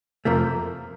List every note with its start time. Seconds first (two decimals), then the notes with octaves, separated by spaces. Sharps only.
0.25 F2 C3 F3 A3 A#4